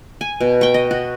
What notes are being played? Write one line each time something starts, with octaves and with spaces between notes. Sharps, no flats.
G#5
B2
G5 C#6
D#5
F#4